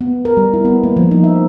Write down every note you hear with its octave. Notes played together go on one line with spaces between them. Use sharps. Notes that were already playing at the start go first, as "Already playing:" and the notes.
B3
A#4
G3
E4
B3
A#3
F3
D#4
E5